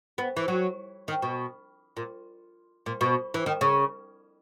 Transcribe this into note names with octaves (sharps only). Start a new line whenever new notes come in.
B3
E3
F#3
D#3
B2
A#2
A#2
B2
E3
D#3
C#3